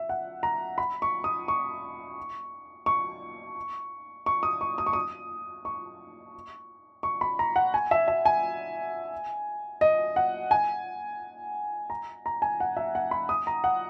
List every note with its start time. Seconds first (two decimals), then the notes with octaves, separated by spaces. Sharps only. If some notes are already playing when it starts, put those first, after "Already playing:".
Already playing: E5
0.09 F#5
0.43 A#5
0.78 B5
1.02 C#6
1.24 D#6
1.48 C#6
2.86 C#6
4.26 C#6
4.43 D#6
4.61 C#6
4.78 D#6
4.86 C#6
4.93 D#6
5.65 C#6
7.03 C#6
7.21 B5
7.39 A#5
7.56 F#5
7.74 G#5
7.91 E5
8.08 E5
8.25 G#5
9.81 D#5
10.16 F#5
10.51 G#5
11.90 A#5
12.26 A#5
12.42 G#5
12.60 F#5
12.77 E5
12.95 F#5
13.11 B5
13.29 D#6
13.47 A#5
13.64 F#5